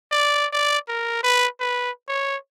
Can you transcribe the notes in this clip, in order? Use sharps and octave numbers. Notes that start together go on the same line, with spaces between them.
D5
D5
A#4
B4
B4
C#5